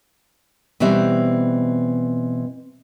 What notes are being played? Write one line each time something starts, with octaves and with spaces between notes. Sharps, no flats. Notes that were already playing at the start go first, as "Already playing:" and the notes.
B2 E3 G3 C4 E5